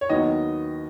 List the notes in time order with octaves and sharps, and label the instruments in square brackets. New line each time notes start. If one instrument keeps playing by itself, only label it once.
[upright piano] C#5
D#2 D#3 F#3 B3 D#5